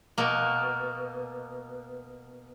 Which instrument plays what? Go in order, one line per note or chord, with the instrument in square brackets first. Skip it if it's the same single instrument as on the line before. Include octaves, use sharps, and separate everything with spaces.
[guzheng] B2 A#3